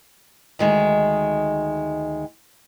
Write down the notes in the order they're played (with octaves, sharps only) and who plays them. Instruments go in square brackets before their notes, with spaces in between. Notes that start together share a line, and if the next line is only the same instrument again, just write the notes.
[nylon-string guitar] D2 D#3 G#3